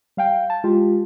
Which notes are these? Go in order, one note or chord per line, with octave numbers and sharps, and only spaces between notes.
G3 F5 G5
A5
G#3 F4 G4